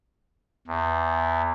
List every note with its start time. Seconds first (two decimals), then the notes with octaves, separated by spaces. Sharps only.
0.67 E2